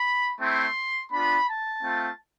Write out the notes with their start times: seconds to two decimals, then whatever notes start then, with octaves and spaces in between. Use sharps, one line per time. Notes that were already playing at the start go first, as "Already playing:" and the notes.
Already playing: B5
0.40 A3 C4 E4 C6
1.11 B3 D4 F4 B5
1.48 A5
1.83 A3 C4 F4